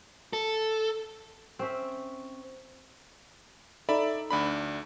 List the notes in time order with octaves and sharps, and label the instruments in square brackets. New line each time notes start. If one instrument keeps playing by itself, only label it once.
[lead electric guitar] A4
[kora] C4 C#4 E5
[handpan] D#4 A4 [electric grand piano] D5 E5 B5
[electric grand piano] D2 D4 B5